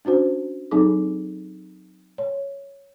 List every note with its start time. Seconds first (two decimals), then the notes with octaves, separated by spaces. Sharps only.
0.05 C#4 D4 F#4 C5
0.71 F#3 C4 D#4 G#4 A4 D6
2.18 C#5